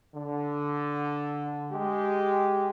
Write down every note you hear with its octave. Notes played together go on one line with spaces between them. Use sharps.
D3
G#3 G4